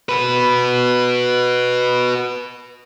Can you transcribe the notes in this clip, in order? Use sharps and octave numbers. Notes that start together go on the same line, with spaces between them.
F#4 B4